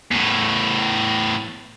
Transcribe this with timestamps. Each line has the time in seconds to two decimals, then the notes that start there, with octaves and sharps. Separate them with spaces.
0.11 E2 A2